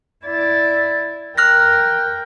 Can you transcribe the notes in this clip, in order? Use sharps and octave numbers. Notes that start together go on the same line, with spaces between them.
E4 D5
A#4 G5 F6 F#6 A#6